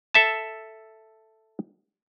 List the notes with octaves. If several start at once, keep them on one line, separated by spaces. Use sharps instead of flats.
A4 E5 A5